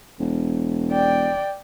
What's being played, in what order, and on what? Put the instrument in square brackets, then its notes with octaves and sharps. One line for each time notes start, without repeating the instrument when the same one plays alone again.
[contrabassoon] E1
[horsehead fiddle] D5 G5